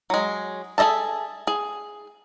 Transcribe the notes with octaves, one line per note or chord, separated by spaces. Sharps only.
F#3 G#3
G#4 A4 D#5 E5 A5
G#4